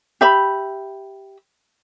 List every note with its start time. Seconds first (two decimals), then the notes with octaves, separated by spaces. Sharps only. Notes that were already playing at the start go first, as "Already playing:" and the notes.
0.21 G4 E5 B5